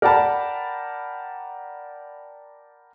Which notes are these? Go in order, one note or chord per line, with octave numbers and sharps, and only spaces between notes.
A#4 D5 F#5 G5 A5 B5